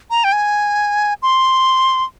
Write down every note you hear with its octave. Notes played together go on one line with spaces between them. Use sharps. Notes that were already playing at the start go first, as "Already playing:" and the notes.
A#5
G5
G#5
C6